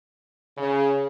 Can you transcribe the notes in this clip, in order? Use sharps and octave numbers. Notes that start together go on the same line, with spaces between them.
C#3